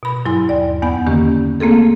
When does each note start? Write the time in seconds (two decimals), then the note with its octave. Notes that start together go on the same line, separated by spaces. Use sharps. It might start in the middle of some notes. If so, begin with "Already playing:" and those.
0.03 B2 B5
0.25 G2 F#3 E4 G#5 C6
0.49 D#2 D5
0.82 E2 B3 D#4 F#5 B5
1.06 D3 D#3 A#3 C#4 G4
1.60 A3 A#3 C4 G#4 A4